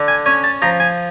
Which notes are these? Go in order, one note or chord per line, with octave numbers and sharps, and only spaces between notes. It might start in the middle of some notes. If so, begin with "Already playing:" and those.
Already playing: D3
G#5
C#4 G#5
A5
F3 A#5
G#5